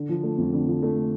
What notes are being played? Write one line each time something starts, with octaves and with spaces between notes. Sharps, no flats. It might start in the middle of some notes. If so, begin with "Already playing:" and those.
Already playing: D3
F3
A3
F2
D3
F3
A3